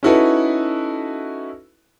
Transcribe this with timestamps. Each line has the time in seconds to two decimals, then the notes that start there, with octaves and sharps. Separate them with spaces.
0.03 C#4 D#4 E4 F#4 A4 B4